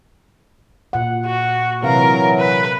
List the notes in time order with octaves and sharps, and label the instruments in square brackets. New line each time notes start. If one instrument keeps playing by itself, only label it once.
[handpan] A#2 F#5
[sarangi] F#4
[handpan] C3 F5 [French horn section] E3 F#3 [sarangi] A#4
[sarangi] B4